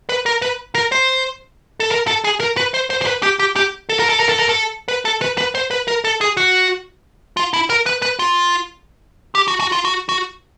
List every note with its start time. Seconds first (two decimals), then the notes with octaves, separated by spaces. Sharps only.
0.09 B4
0.26 A#4
0.42 B4
0.75 A#4
0.92 C5
1.80 A4
1.91 A#4
2.07 A4
2.24 G#4
2.40 A#4
2.57 B4
2.74 C5
2.90 C5
3.02 C5
3.07 B4
3.23 G4
3.39 G4
3.56 G4
3.89 A4
3.99 A#4
4.09 A4
4.20 A#4
4.29 A4
4.39 A#4
4.49 A4
4.88 B4
5.05 A4
5.22 B4
5.38 B4
5.55 C5
5.71 B4
5.88 A#4
6.04 A4
6.21 G#4
6.37 F#4
7.37 F4
7.53 E4
7.70 A#4
7.86 B4
8.02 B4
8.19 F4
9.35 G4
9.48 F#4
9.60 F#4
9.72 F4
9.85 F#4
10.09 F#4